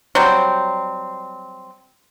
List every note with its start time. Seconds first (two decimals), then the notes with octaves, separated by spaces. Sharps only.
0.15 F#3 G3 C4